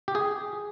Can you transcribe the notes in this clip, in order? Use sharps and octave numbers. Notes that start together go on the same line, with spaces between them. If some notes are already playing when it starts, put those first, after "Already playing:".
G4
G#4